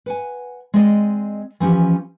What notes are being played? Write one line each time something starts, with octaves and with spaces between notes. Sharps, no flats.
B4 F#5 G#5
G#3 C4 G#4 D5 D#5
E3 F3 C#4 G4